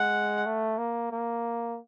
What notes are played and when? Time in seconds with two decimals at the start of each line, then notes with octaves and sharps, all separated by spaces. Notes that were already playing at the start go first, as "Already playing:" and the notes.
Already playing: G#3 F#5
0.46 A3
0.78 A#3
1.11 A#3